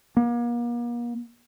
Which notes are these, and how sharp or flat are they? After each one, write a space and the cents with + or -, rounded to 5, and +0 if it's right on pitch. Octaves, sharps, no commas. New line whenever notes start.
A#3 +40